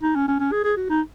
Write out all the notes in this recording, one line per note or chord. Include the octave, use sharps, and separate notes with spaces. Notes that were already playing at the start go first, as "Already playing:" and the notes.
D#4
C#4
C#4
C#4
G#4
G#4
F#4
D#4